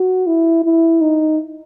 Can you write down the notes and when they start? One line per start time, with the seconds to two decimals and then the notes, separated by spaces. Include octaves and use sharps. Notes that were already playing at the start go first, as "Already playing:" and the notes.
Already playing: F#4
0.27 E4
0.64 E4
1.01 D#4